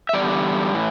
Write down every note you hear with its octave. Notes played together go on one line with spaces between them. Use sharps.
E5
E2 D3 G3 D5
A2 E3